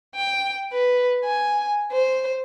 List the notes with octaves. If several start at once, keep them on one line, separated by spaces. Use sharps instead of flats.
G5
B4
G#5
C5